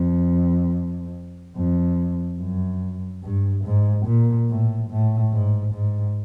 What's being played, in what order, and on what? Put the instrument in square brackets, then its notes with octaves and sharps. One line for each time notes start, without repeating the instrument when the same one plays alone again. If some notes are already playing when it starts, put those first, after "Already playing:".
Already playing: [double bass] F2
F2
F#2
G2
G#2
A#2
A2
A2
G#2
G#2